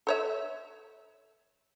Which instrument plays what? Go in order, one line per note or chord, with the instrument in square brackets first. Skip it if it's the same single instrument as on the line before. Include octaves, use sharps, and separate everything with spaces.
[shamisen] A4 C#5 E5